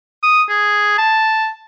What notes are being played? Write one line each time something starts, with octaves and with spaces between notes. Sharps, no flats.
D#6
G#4
A5